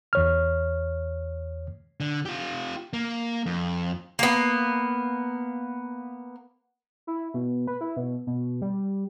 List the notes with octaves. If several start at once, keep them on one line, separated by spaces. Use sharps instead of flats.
E2 C#5 F6
D3
F4 G4
A#3
F2
A#3 B3
E4
B2
B4
E4
B2
B2
G3